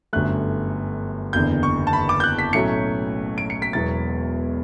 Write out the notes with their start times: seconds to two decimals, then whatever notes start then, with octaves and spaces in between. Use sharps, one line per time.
0.13 G1 F#2 D3 A3 F#6
1.33 F#1 E2 D3 G6
1.63 C#6
1.87 A5
1.93 B5
2.09 D6
2.20 G6
2.24 F#6
2.39 B6
2.53 B1 A2 F#3 A3 C#4 C#7
3.38 D7
3.50 C#7
3.62 B6
3.73 E1 E2 B2 F#3 B3 A6